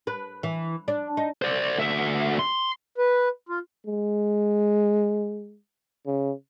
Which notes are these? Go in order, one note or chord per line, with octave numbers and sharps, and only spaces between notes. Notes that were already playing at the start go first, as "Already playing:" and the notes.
B4
E3
D4
D#4
C5 D5
D2 E5
C6
B4
F4
G#3
C#3